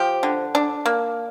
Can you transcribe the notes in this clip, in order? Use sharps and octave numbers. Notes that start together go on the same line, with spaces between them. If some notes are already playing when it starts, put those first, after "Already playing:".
Already playing: F3 G4
D3
D4
A#3